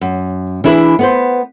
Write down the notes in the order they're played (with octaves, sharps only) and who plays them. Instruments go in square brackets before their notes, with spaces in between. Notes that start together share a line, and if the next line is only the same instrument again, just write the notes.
[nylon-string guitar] F#2
E3 D4 E4 G#4 A#4 B4
B3 B4 C5